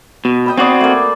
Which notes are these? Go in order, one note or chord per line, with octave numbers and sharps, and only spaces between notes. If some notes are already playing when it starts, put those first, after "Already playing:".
B2
D#5 G5 B5
C4 F#4 G#4 D5
A3 A#3